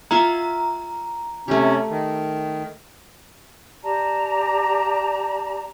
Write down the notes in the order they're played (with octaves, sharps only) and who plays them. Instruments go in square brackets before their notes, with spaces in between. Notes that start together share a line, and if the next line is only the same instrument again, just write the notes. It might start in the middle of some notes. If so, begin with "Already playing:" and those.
[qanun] F4 E5 F#5 [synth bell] A#5
[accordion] C3 C#4 [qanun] A3 G4
[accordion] D#3
[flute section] G4 D5 A5 A#5